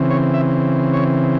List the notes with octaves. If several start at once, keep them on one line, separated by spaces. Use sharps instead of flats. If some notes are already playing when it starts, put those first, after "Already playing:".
Already playing: C#3 E3 C4
C#5
E5
C#5